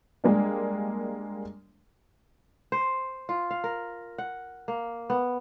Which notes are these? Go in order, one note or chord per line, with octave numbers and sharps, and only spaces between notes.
G3 G#3 A#3 D4
C5
F4
F5
A#4
F#5
A#3
B3